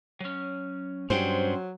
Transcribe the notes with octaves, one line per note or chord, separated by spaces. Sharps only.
F#3 C#4
G2 F#3 C#4 C5 G5